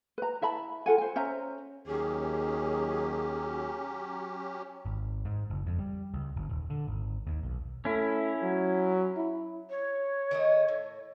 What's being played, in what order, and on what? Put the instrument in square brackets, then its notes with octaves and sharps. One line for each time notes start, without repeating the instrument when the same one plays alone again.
[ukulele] B4 A#5
E4 E5 A5 B5
F4 A4 F#5 G#5
C5 G#5
C#4 C5 E5 A#5
[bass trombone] D#2 [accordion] F#3 C#4 G4 [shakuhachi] G#4
[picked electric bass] G#1
G#2
F#1
F2
G3
C#2
G1
D#1
D3
G#1
D#2
B1
[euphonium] A3 [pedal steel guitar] C#4 E4
[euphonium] F#3
E4
[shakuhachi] C#5
[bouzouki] D#3 A3 D#5
A2